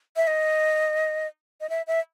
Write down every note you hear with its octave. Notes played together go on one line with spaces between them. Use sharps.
E5
D#5
D#5
E5
E5